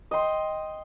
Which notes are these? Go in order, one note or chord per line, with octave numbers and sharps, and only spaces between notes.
D#5 G5 C6